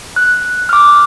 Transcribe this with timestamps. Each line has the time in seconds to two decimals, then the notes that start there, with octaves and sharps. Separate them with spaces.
0.16 F#6
0.69 D6 F6